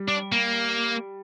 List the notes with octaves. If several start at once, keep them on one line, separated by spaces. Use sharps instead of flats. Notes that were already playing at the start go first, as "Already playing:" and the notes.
Already playing: G3
D4
A#3